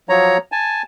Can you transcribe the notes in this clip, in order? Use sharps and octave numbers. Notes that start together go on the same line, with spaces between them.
F3 F#3 C#5 A#5
G#5 A5